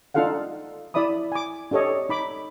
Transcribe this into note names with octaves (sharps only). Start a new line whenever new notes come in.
D4 D#4 F4 A4 F5 F#5
E4 D5 E5 B5 D#6
G#5 D6
D4 G4 A4 C#5 D#5
D#4 B5 D6